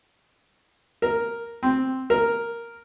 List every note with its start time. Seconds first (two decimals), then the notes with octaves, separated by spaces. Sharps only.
1.02 A#4
1.63 C4
2.10 A#4